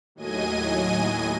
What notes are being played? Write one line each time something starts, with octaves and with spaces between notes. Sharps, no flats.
D#2 A2 F#3 D#5 G#5 D#7